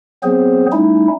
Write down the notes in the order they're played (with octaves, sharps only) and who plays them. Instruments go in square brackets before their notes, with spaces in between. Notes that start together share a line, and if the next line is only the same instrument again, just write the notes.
[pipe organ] F#3 B3 C4 G#4 C5
G3 A3 C#4 D#4 E4